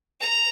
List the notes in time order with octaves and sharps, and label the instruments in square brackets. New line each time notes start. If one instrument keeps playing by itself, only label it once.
[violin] A#5